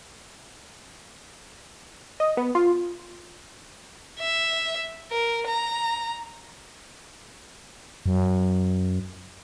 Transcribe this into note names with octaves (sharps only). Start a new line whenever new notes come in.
D#5
B3
F4
E5
A#4
A#5
F#2